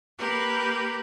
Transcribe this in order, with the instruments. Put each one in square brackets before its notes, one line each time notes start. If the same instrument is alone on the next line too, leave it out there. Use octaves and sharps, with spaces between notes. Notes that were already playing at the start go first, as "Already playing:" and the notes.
[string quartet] A#3 G4 A#4 B4